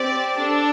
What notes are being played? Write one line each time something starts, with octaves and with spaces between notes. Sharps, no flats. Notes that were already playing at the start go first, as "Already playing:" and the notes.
Already playing: C4 G4 D5
D4 A4